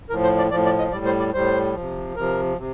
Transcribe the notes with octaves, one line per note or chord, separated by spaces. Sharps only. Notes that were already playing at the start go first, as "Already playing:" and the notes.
A2 F3 A#4
C5
D5
A2 F3 D5
D5
D#5
A2 G3 D5
C5
D5
A2 G3 C5
C3 F3
C3 F3 A#4
C3